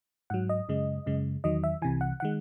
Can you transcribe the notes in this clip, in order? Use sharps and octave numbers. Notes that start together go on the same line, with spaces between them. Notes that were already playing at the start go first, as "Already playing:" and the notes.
G#2 F#3 F#5
D#5
F#2 C#3 G#3
F#2 C#3 G#3
E2 D#3 F#3 D#5
E5
C2 C3 E3 G#5
F#5
D#3 G#3 F#5